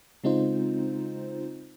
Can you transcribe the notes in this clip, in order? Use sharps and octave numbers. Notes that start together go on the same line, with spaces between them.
C#3 G#3 C4 D#4 F4 C5